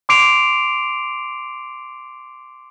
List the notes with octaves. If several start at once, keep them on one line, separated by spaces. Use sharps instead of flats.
C6 D6 C7 D7 F7